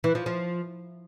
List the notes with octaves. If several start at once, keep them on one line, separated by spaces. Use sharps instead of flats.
E3
F3
F3